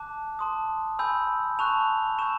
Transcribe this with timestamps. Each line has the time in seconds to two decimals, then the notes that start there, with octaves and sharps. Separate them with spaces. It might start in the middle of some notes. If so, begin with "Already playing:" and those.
Already playing: A5 D6 F#6
0.39 A5 C6 D#6
0.99 G#5 B5 E6 G6
1.59 A5 C#6 F#6 F7
2.19 C#6 E6 G6 E7